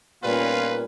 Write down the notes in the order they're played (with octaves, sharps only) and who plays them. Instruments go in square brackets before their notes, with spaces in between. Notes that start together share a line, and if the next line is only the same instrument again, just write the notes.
[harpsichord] G2 A#2 A#3 [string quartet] B3 C#4 D#4 [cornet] F4 [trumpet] B4